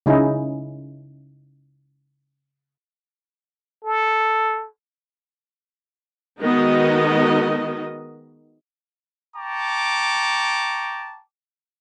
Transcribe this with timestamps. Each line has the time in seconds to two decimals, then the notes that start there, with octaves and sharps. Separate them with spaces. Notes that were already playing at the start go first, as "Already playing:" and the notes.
0.06 C#3 C#4 D#4 E4 G#4
3.84 A4
6.39 D#3 G#3 B3 D#4 F#4 D#5
9.37 G5 A5 A#5 C#6 D6